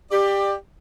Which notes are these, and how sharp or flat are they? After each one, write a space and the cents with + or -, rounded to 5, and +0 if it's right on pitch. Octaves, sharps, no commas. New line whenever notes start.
G4 +15 D5 +30